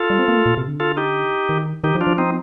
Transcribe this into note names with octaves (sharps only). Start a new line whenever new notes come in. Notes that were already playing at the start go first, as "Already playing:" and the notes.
Already playing: F4 A4
G3
C4
A#3
A3
A#2
C3
D3
F4 A4
D#4 G4
D#3
D#3 D#4 G4
F3
D4 F4
F3
C4 D#4